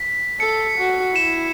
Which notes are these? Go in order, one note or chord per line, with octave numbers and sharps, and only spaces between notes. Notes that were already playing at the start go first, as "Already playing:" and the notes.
Already playing: B6
A4 C#7
F#4
E4 E7